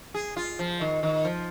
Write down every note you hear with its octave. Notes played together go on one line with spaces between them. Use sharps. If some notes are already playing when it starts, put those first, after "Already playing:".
G#4
F4
F3
D#3
D#3
F3